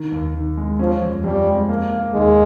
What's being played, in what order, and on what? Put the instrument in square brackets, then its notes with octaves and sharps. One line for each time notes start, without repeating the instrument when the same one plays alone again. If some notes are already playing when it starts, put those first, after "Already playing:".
Already playing: [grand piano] D#3
D#2
D#3
G#3
[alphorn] F3 [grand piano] C#4
[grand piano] F2
[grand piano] F2 [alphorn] G3
[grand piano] G#3
A#3
A#3
[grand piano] D#2 [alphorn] G#3